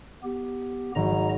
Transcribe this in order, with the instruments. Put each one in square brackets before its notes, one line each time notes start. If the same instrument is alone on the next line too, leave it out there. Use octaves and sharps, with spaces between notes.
[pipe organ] B3 G4
[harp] G#1 F#3 [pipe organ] D#5 A#5